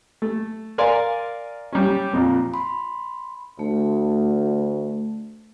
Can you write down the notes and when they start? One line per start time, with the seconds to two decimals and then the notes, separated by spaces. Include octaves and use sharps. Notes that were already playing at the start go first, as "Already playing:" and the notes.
0.22 A3
0.78 A#4 D5 F5 G#5 C6
1.72 G3 C#4
2.13 F2 A#2
2.54 B5 C6
3.59 D2 A3